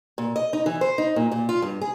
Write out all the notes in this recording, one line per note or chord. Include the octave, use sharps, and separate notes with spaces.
A#2
D#5
D#4
E3
C5
D#4
A#2
A#2
F4
G2
G#4